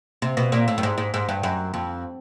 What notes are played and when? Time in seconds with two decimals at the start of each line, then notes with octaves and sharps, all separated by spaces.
0.22 C3
0.37 B2
0.52 A#2
0.68 A2
0.78 G2
0.83 G#2
0.98 G#2
1.14 G#2
1.29 G2
1.43 F#2
1.74 F2